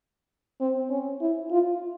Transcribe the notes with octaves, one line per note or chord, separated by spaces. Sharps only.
C4
C#4
E4
F4